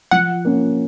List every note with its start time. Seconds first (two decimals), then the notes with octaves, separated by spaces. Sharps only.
0.11 F3 F#5
0.45 A#3 C#4